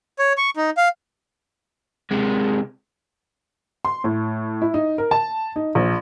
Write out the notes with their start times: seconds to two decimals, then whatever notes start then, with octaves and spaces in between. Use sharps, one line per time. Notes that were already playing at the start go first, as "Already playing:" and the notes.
0.19 C#5
0.38 C#6
0.57 D#4
0.77 F5
2.11 C3 G#3
3.85 C6
4.04 A2
4.62 E4
4.74 D#4
4.98 A#4
5.11 A5
5.56 D#4
5.75 A#1